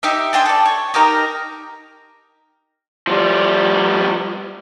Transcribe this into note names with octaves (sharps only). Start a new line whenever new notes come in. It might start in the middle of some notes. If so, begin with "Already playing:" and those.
D#4 G4 E5
D4 G#4 G5 C6
A4 D5
C#5
D#4 G4 A#4 A#5
F3 G3